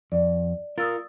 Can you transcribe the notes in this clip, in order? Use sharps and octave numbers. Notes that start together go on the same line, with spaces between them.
F2 D5
F4 A#4 D#6 E6 A6